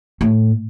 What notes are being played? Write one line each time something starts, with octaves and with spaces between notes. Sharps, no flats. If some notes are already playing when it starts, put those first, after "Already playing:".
A2